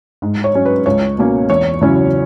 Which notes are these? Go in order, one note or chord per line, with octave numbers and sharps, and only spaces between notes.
G#2
C#5
F#3 C#4
B4
C#2 C#5
B2 A#3 C#4
E2 C#5
C#3 F#3 C#4 E4